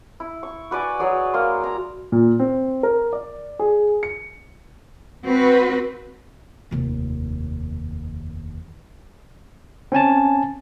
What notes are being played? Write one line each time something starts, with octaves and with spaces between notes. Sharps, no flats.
E4
C#6
F#4 B4 D5 G#5
F#3 G#4 C#5 D5
A#3 C6
A#5
A#2
C4
A#4
D5
G#4
C#7
C4 F#4 B4
F1 D#2
C4 C#4 G#5 A5